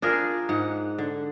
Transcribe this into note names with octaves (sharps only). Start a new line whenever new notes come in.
D4 F4 G#4 A#4
G#2 F#5
D3